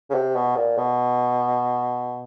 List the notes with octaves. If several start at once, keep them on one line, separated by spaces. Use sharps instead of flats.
C#3
C3
B2
A#2
B2